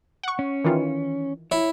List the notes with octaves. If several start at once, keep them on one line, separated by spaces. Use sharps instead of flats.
F#5 C#6
C#4
D#3 E3 F4
E4 C#5